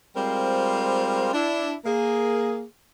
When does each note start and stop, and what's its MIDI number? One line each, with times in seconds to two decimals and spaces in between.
0.16 1.32 55
0.16 1.32 56
0.16 1.32 60
0.16 1.32 65
0.16 1.32 70
0.16 1.32 72
1.33 1.74 62
1.33 1.74 64
1.85 2.63 58
1.85 2.63 68